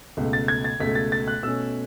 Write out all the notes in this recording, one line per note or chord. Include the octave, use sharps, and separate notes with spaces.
C#2 B2 A3
A6
G#6
A6
C#2 B2 A3 B6
A6
A6
F#6
B2 A3 C#4 E6